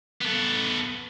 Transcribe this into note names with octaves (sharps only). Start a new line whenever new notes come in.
B3 A4